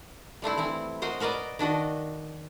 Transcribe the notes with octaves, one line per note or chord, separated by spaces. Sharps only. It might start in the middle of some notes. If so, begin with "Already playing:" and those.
G3 A3 C4 E4
E3 C4 E4
F#4 A#4 C5 D#5
F#4 A#4 B4 D5 D#5
D#3 D4 F#4 D#5